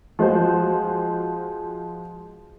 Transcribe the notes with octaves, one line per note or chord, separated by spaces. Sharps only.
F3 G#3 F#4 C5